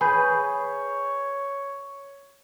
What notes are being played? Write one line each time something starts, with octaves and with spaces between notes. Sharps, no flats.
G#4 B4 C#5 G#5 B5 G6